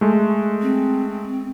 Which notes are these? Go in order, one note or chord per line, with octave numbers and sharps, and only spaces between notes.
G#3 A3
C4